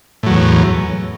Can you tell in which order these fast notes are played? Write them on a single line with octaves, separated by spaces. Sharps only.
A2 F#3 E2